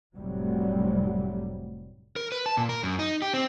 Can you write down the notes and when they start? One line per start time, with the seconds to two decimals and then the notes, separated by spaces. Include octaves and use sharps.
0.16 F1 A2 C3 F#3 G3
2.16 A#4
2.32 B4
2.46 A5
2.57 A#2
2.69 A#4
2.83 F#2
2.99 D#4
3.22 G4
3.33 C4